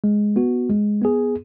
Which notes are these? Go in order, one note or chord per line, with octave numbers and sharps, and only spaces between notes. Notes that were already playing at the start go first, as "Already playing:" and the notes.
G#3
B3 F#4
G#3
B3 G#4